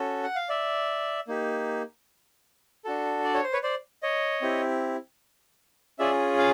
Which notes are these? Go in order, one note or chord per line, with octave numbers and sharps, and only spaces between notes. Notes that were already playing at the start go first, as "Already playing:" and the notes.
Already playing: C#4 F#4 A4
F#5
F5
D5 E5
A#3 D#4 G4
D4 F#4 A4
D5
C#5
C5
B4 C#5
C5 D5
C#5 D#5
C4 E4 G4
C#4 F4 G#4 D5 E5
F5